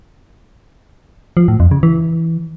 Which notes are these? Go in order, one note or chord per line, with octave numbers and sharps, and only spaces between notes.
F3
A2
F2
C#3
E3